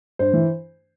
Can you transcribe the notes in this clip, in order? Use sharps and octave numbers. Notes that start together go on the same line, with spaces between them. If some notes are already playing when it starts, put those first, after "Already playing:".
G2 C5
E3